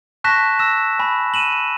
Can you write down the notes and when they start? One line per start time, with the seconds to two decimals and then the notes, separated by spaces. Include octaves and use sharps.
0.24 A5 C#6 F#6 A#6 B6 E7
0.59 E6 A#6 E7
0.99 G#5 B5
1.34 D#7 E7 F#7